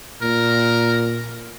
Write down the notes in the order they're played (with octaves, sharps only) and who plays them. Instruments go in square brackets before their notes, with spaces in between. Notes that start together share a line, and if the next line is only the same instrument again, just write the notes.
[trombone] A#2 [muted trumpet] A#4